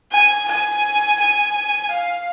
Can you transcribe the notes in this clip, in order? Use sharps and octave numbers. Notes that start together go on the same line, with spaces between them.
G#5
G#5
G#5
F5